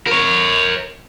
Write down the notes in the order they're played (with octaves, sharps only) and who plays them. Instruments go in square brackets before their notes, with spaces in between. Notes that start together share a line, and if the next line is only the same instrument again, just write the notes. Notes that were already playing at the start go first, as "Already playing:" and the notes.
[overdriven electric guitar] A#4 C#5